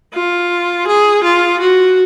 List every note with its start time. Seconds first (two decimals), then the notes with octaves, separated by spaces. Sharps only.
0.14 F4
0.87 G#4
1.23 F4
1.60 F#4